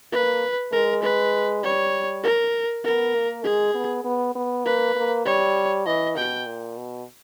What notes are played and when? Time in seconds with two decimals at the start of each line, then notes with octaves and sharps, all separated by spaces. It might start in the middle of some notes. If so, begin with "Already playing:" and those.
0.12 A#3 B4
0.72 G#3 A#4
1.02 B4
1.63 G3 C#5
2.23 A#4
2.84 B3 A#4
3.15 A#3
3.44 G#3 G#4
3.75 B3
4.05 B3
4.35 B3
4.65 A#3 B4
4.96 A#3
5.25 G3 C#5
5.86 E3 D#5
6.17 B2 G5
6.46 A#2
6.77 B2